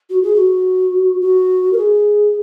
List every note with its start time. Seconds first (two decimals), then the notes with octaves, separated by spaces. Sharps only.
0.10 F#4
0.23 G#4
0.35 F#4
1.21 F#4
1.73 A#4
1.77 G#4